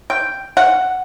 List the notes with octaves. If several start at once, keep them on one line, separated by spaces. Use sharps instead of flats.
G5
F#5